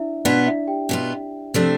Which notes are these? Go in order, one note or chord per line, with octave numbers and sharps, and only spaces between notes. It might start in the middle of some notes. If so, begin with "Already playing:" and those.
Already playing: D4 E4 D5 E5
B2 B3 D4 F4 D5
E4 E5
G4 G5
B2 B3 F4
C3 F3 A3 D4